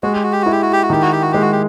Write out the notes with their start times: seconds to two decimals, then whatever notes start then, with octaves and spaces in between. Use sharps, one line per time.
0.03 G#3 F#4
0.13 G4
0.23 F#4
0.32 G4
0.42 E4 F#4
0.52 G4
0.62 F#4
0.73 G4
0.83 F#4
0.90 D#3 G4
1.02 F#4
1.12 G4
1.22 F#4
1.32 G#3 G4
1.42 F#4
1.52 G4